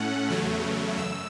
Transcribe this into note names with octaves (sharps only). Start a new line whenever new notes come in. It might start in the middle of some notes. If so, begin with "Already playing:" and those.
Already playing: A2 A3 C#4 F#5
E2 C#3 F#3 A3
F#2 E6